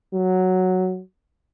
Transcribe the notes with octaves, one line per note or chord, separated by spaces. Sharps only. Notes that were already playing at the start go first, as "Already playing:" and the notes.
F#3